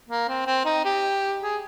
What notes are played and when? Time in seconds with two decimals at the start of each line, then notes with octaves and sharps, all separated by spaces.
0.09 A#3
0.29 C4
0.47 C4
0.65 D#4
0.85 G4
1.42 G#4